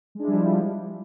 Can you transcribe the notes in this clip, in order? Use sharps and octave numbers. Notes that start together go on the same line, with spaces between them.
F3 G3 G#3 D4 E4